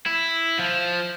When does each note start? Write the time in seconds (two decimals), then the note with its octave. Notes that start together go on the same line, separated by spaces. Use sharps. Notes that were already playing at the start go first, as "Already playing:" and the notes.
0.06 E4
0.59 F3